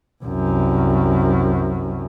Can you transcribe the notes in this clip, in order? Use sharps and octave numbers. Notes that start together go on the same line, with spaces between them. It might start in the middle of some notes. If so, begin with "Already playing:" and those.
C2 F#2